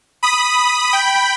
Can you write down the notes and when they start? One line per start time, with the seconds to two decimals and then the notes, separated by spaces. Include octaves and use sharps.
0.23 B5 D#6
0.93 G5 B5